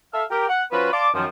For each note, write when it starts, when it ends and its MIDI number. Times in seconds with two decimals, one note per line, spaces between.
0.13 0.24 69
0.13 0.24 76
0.13 0.24 77
0.30 0.47 67
0.30 0.47 70
0.48 0.64 78
0.72 0.89 53
0.72 0.89 61
0.72 0.89 65
0.72 0.89 66
0.72 0.89 71
0.92 1.08 74
0.92 1.08 77
0.92 1.08 81
0.92 1.08 84
0.92 1.08 86
1.14 1.26 42
1.14 1.26 51
1.14 1.26 53